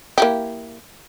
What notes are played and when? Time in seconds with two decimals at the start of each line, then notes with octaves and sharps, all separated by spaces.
0.18 A#3 E4 G4